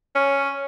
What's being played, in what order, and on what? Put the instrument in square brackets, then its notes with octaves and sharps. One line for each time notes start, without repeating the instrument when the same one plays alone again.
[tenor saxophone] C#4